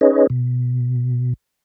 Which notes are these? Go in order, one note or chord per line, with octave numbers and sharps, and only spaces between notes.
C#4 D#4 G#4 B4 C#5 D#5
B2